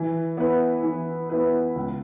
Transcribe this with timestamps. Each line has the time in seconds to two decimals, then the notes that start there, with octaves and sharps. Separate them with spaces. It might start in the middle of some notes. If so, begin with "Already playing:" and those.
Already playing: E3
0.37 B3 E4 B4
0.83 E3
1.30 B3 E4 B4
1.75 C#2